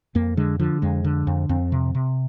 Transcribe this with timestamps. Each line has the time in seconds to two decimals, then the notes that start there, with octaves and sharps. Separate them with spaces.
0.15 F2 A#3
0.37 D3 G#3
0.59 D3 F3
0.82 F2 G#3
1.04 D3
1.27 F2
1.49 F2 C4
1.72 C3
1.95 C3